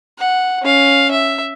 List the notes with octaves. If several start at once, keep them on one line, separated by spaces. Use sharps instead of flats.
F#5
C#4 F5
E5